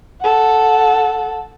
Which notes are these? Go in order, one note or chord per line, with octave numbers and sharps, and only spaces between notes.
A4 F#5